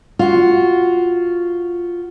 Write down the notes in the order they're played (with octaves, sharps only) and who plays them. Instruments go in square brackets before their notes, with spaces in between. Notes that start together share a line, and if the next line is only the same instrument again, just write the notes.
[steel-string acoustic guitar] F4 F#4